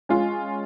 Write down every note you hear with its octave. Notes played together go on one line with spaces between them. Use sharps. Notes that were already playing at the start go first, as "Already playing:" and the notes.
G#3 C#4 F4